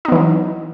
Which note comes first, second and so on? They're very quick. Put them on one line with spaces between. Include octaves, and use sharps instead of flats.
D#4 B3 E3 F#3